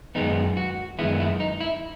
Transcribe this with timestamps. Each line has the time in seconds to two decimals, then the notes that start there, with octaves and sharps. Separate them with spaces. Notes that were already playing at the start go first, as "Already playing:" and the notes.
0.15 F#2 D#3 G#3 B3 D#4
0.57 F#4
0.99 F#2 D#3 G#3 B3 E4
1.20 E4
1.40 D#4
1.60 E4